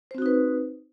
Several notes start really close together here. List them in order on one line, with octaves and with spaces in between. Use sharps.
C5 C4 F#4 D#4 B4